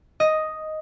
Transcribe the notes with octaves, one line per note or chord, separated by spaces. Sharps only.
D#5